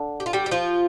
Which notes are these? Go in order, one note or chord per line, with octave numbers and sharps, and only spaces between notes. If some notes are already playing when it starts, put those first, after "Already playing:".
Already playing: D3
G4
F4
G3 G4
G4
F3 F4